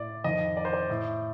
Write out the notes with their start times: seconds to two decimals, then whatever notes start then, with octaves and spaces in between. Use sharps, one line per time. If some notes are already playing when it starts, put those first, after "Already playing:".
Already playing: A2 D5
0.24 F2 D#3 D#5
0.57 D5
0.65 C5
0.73 D5
0.90 A2